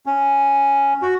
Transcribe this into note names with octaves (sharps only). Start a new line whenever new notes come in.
C#4
F#4